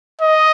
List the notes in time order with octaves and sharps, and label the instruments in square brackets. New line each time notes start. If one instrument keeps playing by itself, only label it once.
[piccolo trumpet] D#5